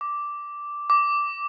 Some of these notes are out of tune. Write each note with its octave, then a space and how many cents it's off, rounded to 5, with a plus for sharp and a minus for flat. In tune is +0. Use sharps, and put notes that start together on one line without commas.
D6 -5
D6 -10